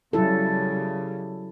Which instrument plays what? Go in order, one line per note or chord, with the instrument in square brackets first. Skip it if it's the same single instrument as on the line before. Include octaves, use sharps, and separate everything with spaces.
[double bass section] C#3 G3 [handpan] F#3 E4 A4